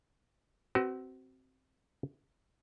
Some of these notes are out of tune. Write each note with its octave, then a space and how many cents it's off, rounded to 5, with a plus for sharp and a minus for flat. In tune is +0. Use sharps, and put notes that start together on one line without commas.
C4 +0 F#4 +30 B4 +0